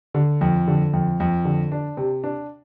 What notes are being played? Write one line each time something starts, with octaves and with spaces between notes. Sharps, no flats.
D3
F2
D3
F2
F2
D3
D4
C3
D4